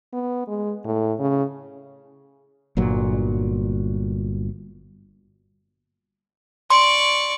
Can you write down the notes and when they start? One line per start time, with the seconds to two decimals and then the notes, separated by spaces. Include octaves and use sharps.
0.14 B3
0.48 G#3
0.85 A2
1.19 C#3
2.77 G1 A#2 F#3
6.70 D5 C6 C#6